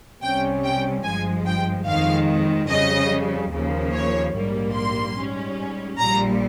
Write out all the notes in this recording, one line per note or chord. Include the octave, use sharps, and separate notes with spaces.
C2 C3 G3 C#4 G5
G5
G1 G2 F3 G#3 G#5
G5
F2 D#3 G#3 F5
F2 C#3 G3 D#5
D#2 C#3 F3 A#3
C#5
A#1 G#2 G3 A#3
C6
G#2 G3 C#4
A#1 A#2 G3 A#5